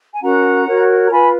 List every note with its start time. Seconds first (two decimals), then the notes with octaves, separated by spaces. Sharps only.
0.12 G#5
0.21 C#4 F#4 A#4 F#5 A#5
0.66 F#4 A#4 C#5
1.06 A#5
1.10 F4 B4 G#5 B5